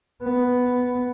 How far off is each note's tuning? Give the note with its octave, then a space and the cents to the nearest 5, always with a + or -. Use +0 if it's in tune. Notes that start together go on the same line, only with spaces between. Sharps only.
B3 +5